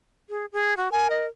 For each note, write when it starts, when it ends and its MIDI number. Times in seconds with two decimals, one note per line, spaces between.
0.29 0.46 68
0.53 0.74 68
0.77 0.91 66
0.92 1.28 70
0.92 1.08 80
1.10 1.26 75